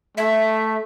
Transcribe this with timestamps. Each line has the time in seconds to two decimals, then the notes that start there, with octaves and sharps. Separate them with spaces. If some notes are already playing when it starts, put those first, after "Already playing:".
0.17 A3 E5